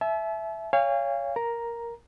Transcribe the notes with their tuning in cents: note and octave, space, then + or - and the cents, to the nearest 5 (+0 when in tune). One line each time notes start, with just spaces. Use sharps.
E5 +0 A5 -45
C#5 +15 F5 -20 G#5 -40
A#4 +5 A#5 +5